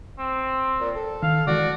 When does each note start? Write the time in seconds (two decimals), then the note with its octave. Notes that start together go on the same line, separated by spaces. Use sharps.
0.18 C4
0.80 A#2
0.96 A4
1.22 D#3 F5
1.47 D#3 E3 G#3 F#4 D5